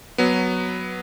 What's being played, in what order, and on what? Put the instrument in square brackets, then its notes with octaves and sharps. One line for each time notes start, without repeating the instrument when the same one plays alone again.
[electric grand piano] F#3 B3